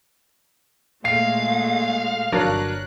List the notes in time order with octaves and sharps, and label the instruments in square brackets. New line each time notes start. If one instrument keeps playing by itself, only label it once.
[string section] A#2 G#3 A3 [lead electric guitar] F5 [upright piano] C7
[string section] G1 F#6 [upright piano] F#3 D4 A#4